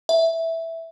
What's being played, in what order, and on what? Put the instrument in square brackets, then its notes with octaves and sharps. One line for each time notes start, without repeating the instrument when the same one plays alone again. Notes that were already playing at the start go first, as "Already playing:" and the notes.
[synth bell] E5